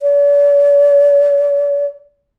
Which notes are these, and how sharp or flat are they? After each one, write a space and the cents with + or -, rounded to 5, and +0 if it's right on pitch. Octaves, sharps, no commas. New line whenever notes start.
D5 -45